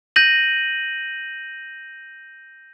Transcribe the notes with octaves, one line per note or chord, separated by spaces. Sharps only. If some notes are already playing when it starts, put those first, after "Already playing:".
G6 A#6 D#7 F#7